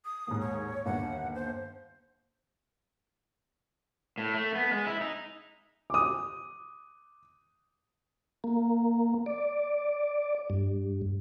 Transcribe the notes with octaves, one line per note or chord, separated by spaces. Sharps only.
D#6
D#2 G#2
C#5
G1 D#2 F#5
C5
A2
A3
B3
G#3
E4
D#4
D6 D#6
A#3
D5
G2